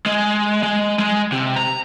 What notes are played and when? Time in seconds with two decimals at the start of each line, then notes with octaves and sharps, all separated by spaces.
0.06 G#3
0.63 G#3
0.99 G#3
1.32 C3
1.56 A#5